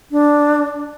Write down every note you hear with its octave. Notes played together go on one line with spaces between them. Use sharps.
D4